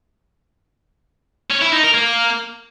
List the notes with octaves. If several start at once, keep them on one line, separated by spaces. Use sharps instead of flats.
C#4
E4
D#4
A#4
A#3